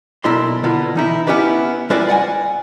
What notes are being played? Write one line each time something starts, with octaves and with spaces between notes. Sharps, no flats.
B1 A#3 E4 D5 C6
D3 B3 E4 F4
E3 D#4 E4
B3 C#4 E4 G4 B4 D5
G3 C#4 E4 F4 B4 D5
D5 F#5 G#5